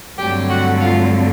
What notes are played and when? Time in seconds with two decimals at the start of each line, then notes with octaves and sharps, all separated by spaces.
0.18 G2 D3 F#3 A3 C4 G4 G5
0.49 F#4 F#5
0.81 F4 F5